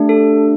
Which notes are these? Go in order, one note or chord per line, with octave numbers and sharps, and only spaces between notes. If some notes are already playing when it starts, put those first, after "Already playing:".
Already playing: A3 D4 G4
A4